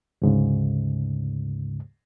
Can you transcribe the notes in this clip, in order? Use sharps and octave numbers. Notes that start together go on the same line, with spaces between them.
D2 G#2 C#3